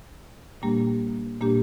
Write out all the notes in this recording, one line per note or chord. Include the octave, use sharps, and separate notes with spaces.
A#2 G3 A#3 D4 G4
A#2 G3 A#3 D4 G4